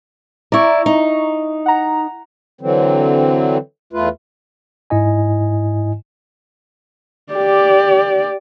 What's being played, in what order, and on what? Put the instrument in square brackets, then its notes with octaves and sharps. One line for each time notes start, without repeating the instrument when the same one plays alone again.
[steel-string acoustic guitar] E4 D5 [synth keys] A#5 C#6
[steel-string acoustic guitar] D#4
[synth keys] F#5 A#5
[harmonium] D3 E3 F#3 C4
E2 A3 F4 B4
[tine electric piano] G#2 E4 D#5 G#5
[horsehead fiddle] G4 D5